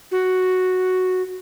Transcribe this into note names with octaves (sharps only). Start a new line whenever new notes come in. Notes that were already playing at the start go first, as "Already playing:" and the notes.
F#4